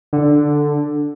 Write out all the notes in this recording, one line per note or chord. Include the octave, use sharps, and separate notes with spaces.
D3